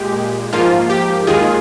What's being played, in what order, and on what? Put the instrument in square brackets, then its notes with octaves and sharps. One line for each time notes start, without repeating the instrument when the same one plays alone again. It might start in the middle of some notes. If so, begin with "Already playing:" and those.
Already playing: [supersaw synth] A#2 G#3 G4
G#2 F3 A#3 F4
G4
D#2 D#3 G#3 F4 G#4